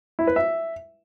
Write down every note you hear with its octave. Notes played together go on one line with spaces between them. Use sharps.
E4
B4
E5